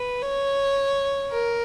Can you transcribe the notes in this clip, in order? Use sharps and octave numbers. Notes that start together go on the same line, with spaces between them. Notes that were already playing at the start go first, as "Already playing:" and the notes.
Already playing: B4
C#5
A#4